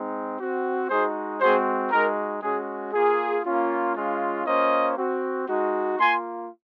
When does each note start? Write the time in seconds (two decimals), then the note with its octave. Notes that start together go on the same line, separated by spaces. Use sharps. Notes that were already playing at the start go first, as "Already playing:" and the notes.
Already playing: G#3 C4 D#4
0.39 C4 F#4
0.89 G#3 D#4 F#4 G#4 C5
1.41 G#3 C4 F#4 G#4 C5
1.91 G#3 D#4 F#4 A#4
2.43 G#3 C#4 F#4 G#4
2.94 A#3 F4 G#4
3.45 A#3 C#4 F4
3.96 G#3 C#4 F4
4.46 A#3 C#4 F4 C5 D#5
4.98 C4 F#4
5.48 G#3 D#4 F#4
5.99 A#3 F4 G#5 C6